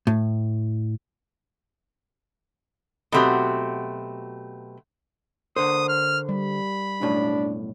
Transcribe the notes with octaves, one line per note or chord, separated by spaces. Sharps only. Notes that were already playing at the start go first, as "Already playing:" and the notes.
A2
B2 F#3 A3 C4 F#4 G4
D3 A#4 C5 D#6
F6
G3 B5
B1 F#2 A2 D4